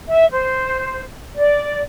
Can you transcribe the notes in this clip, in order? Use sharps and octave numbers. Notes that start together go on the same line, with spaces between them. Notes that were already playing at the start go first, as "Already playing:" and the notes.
E5
C5
D5